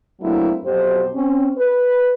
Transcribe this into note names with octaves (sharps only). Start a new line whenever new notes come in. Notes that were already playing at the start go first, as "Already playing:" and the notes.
F#3 A3 A#3 C4 D4 E4
F2 B2 F#3 G4 C5
C4 C#4
B4